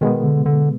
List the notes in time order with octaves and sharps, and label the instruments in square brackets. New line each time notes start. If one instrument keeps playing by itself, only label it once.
[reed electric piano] B2 G#3 B3 [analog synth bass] D#3
[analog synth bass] D3
D3